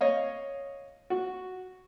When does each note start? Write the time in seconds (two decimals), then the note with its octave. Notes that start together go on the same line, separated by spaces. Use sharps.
0.01 C#5 D#5 F5
1.10 F#4